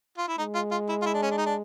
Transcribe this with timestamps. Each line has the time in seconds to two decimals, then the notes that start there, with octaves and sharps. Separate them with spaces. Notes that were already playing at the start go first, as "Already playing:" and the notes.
0.18 F4
0.28 E4
0.38 G#3 D#4
0.55 F4
0.71 F4
0.89 E4
1.02 F4
1.06 E4
1.14 D4
1.22 C#4
1.31 D4
1.38 D#4
1.46 D4